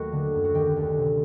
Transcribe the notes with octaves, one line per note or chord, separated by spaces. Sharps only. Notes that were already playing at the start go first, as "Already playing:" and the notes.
Already playing: D#2 F#3 A3 F#4
D3
F#2
F#4
D#3 G4
G4
D2
C3